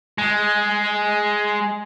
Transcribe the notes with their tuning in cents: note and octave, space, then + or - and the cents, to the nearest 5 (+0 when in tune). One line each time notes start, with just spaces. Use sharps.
G#3 +5